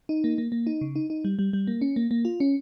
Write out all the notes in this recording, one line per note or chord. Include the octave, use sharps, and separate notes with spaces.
D#4
A#3
A#3
A#3
D#4
C#3
D#4
D#4
G3
G3
G3
A#3
C#4
A#3
A#3
F4
C#4